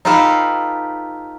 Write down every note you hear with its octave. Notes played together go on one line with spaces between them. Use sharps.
D#4 F4 G4 A4 B4 F5